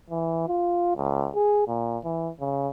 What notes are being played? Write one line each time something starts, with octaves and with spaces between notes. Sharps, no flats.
E3
F4
C#2
G#4
A#2
E3
C#3